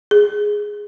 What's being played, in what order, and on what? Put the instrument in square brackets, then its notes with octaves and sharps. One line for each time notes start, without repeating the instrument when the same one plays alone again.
[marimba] G#4